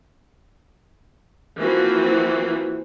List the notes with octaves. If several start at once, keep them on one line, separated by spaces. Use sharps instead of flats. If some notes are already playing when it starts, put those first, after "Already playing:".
E3 F3 A#3 C4 F#4